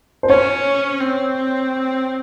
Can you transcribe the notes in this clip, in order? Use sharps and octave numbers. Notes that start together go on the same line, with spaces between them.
C5
C#4 C#5
C4